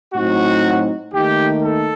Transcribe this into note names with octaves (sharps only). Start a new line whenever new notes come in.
A2 F#3 C4 D#4 F#4
D#2 D#3 A3 D#4 G4
A4